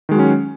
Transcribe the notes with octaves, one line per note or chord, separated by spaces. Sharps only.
D#3 F#3 G#3 C#4 F#4